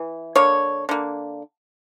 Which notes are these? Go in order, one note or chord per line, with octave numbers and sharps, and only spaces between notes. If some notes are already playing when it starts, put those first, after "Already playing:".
Already playing: E3
D3 A#3 C#5
D3 A#3